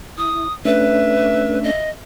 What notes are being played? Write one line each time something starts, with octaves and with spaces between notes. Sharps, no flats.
E4 D#6
A3 C#4 D4 B4 E5
D#5